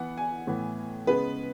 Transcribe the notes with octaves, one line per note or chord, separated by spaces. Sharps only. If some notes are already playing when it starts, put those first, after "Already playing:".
Already playing: E3 B3 F#5
G#5
A2 E3 B3
C#3 G#3 B3 B4